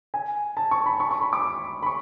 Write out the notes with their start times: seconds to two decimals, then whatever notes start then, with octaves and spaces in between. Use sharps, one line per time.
0.14 G#5
0.57 A5
0.71 C#6
0.86 B5
1.00 C#6
1.11 C#6
1.22 B5
1.33 D6
1.82 B5
1.86 C#6